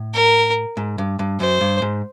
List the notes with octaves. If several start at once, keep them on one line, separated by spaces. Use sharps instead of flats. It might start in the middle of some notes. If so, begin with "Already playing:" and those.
Already playing: A2
A#4
G#2
G2
G2
F#2 C5
G2
G#2